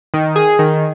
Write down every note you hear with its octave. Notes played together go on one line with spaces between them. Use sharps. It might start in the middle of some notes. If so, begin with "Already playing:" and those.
D#3
G#4
D#3